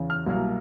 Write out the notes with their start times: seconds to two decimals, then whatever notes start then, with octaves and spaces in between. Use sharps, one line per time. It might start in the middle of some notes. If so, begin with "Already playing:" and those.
Already playing: E2 C#3
0.10 F6
0.26 C2 B2 F#3 A#3